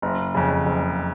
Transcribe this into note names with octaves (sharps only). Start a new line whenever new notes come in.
F#1
F2 C#3
F#1